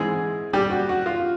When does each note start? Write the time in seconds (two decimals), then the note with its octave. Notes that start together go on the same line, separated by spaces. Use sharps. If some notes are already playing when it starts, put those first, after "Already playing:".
Already playing: G#2 E3 G#3 C4 E4 G#4
0.53 G3 G4
0.70 F#4
0.89 F#4
1.06 F4